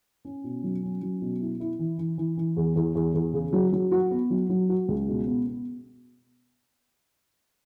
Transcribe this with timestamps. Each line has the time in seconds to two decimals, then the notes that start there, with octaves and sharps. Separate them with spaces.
0.25 C#4
0.44 B2
0.63 F#3
0.83 C#4
1.02 F#3
1.21 B2
1.40 E4
1.60 E4
1.79 E3
1.99 E3
2.18 E3
2.37 E3
2.57 E2
2.76 E2
2.95 E2
3.14 E2
3.34 C#3
3.53 F#3
3.72 F#3
3.92 F#4
4.11 B3
4.30 F#3
4.49 F#3
4.69 F#4
4.88 C#2
5.08 B2
5.27 B3
5.46 B3